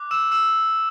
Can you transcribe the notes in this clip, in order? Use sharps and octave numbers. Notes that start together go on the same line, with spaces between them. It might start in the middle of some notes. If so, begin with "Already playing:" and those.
Already playing: D6 F#6
E6 E7
E6 E7